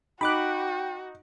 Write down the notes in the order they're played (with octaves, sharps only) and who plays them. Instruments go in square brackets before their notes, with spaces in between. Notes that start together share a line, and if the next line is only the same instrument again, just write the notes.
[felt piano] D#4 [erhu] F#4 [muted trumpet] G5 [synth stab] B5 D6 F#6